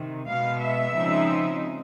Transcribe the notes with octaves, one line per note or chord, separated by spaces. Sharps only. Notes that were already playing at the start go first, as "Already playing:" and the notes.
Already playing: C3 D#3
B2 G#3 B3 F5
E5
C#3 F3 G#3 C4 D#4